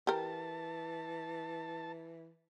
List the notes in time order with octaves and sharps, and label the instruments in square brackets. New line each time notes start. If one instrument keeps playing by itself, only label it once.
[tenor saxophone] E3 [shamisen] G4 A#4 [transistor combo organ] A5